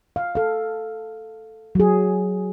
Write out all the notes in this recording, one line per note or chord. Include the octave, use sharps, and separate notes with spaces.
F5
A4 F5
F#3 G#4